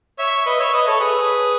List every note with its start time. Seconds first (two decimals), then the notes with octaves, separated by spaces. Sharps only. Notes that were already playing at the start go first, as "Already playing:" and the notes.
0.19 C#5 E5
0.46 B4 D#5
0.60 C#5 E5
0.73 B4 D#5
0.87 A4 C#5
1.00 G#4 B4